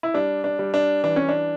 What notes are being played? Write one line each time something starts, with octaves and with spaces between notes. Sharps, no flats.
E4
G3 D4
D4
G3
D4
E3 D4
C#4
D4